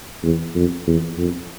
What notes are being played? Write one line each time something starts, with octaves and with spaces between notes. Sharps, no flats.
E2
F2
E2
F2